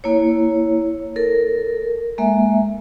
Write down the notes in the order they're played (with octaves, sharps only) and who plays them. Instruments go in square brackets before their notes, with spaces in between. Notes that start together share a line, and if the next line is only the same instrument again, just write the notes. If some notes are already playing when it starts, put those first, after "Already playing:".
[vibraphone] A#3 E4 C#5
A4 A#4
G#3 A#3 E5